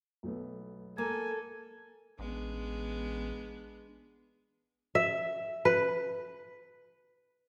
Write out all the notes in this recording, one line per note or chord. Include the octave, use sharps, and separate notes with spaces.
B1 A3 B3
A#3 A4 G#5
A1 G#3 B3 D4
E5
B4